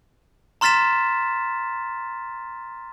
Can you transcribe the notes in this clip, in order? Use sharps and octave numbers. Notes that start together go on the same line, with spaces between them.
A#5 C6 F6 A6 B6 E7